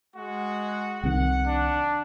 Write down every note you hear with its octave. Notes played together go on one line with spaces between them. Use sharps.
G#3 F#4 F#5
C2 C3 D#3 F#5
D4